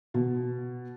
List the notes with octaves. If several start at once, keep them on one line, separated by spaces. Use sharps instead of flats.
B2